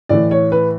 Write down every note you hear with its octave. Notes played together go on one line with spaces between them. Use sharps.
A2 E3 D5
C#5
B4